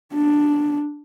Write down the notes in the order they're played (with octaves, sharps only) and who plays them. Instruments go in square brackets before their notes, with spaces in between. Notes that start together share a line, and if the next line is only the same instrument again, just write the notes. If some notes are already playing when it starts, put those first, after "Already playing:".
[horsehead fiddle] D4